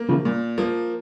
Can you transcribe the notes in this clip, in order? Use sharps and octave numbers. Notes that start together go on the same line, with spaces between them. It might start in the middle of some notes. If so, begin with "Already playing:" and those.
Already playing: A#3
C#3 F3
A#2
F3 A#3